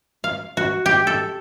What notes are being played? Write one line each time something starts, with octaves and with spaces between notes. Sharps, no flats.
F5
F#4
G4
A4